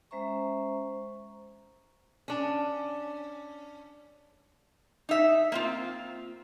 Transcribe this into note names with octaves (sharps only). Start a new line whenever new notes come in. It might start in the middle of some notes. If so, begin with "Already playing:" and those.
G#3 C#4 C5 E5 A#5 C#6
C#4 D4
D#4 E5
A#3 C4 F4